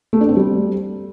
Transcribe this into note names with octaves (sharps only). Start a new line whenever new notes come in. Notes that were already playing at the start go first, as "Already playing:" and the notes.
A3
D4
C4
G3